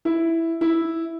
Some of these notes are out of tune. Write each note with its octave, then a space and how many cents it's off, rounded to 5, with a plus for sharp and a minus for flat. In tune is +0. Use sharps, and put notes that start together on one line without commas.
E4 +0
E4 -5